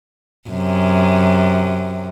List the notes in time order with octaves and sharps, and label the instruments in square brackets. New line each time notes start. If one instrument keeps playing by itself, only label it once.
[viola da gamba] F#2 C3